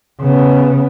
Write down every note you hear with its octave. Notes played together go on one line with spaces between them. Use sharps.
C#3 B3